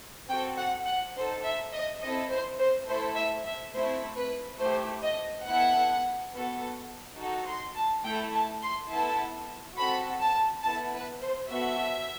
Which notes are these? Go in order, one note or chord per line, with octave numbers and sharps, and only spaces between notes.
C4 F#4 A4 G5
F#5
F#5
D#4 A4 C5
E5
D#5
C4 E4 A4 D#5
C5
C5
A3 E4 A4 C5
E5
E5
A3 C4 E4 C5
B4
A3 E4 G4 C5
D#5
B3 E4 A4 F#5
B3 F#4 A4
D#4 F#4 A4
C6
A5
A3 E4 A4 G5
A5
C6
B3 E4 A4 A5
C4 F#4 A4 B5
A5
B3 E4 A4 A5
B4
C5
B3 F#4 A4 E5